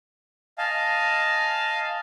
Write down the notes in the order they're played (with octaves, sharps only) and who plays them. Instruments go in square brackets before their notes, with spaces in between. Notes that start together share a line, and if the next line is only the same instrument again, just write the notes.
[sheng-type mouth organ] D#5 F5 G#5 A5